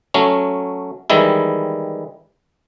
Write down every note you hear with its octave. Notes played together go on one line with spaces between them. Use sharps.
F#3 A3 C#4
D#3 E3 G3 G#3 E4